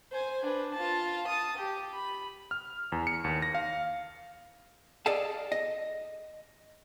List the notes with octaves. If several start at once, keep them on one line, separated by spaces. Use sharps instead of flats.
C5 G#5
D4 B4
F4 A5
A5 D#6
G4
B5
F6
E2
C#7
D#2
A#6
F5
G#4 A4 D5 D#5 F5 A5
D#5